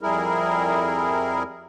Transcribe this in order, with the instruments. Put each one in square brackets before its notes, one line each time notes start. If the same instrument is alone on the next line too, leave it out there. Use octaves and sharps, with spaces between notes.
[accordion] F2 G3 E4 G#4 A#4